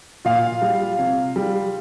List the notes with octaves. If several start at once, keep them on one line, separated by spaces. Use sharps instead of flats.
A#2 F4 F5
G3
C3
G3